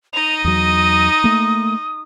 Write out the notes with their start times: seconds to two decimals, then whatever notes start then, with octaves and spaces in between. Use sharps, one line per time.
0.13 D#4 D#5 F7
0.44 E2 F#3 D#6
1.24 A3 A#3